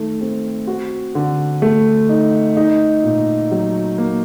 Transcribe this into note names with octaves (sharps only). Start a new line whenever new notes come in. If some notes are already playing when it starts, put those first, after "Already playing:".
Already playing: D#3 A3
C4
F#4
D3
A3
D#4
D#4
A#2
F#3
A#3